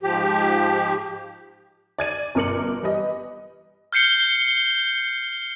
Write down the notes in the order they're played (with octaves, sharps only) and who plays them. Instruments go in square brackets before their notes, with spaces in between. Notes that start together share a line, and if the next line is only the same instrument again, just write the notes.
[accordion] G#2 F3 G4
[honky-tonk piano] D5 G#6 D#7
G1 B2 A#4 D6 C#7 F#7
E3 G3 B4 D#5
[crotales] F6 G6 C7 C#7 G7